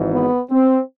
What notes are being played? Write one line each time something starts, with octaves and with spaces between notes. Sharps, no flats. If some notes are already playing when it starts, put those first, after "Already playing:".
Already playing: G#1 G#2 E3
B3
C4